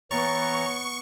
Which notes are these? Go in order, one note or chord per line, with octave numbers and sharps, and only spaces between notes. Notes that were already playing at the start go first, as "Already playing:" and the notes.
E3 B3 C#5 A#5 C#6 A6